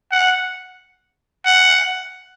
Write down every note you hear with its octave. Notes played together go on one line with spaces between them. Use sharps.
F#5
F#5